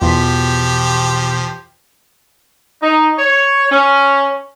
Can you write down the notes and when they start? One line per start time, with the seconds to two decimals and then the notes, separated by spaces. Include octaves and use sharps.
0.01 E2 B2 F3 F4 G4 B6
2.82 D#4
3.19 C#5
3.71 C#4